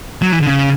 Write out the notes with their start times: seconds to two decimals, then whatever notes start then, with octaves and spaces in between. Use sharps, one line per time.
0.22 F#3
0.32 E3
0.41 D3
0.47 C#3